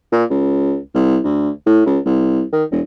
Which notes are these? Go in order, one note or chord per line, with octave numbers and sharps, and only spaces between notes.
A#2
C#2
C2
D2
A2
C#2
C2
D#3
E1